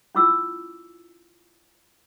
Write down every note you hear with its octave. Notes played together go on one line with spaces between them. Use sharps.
C#4 E4 F4 D6 E6